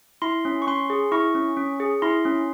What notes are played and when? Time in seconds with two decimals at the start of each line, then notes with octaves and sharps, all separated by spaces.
0.22 E4 C6
0.45 C#4
0.62 C#6
0.67 C#4 C6
0.90 G#4
1.12 E4 C#6
1.35 C#4
1.57 C#4
1.80 G#4
2.02 E4 C6
2.25 C#4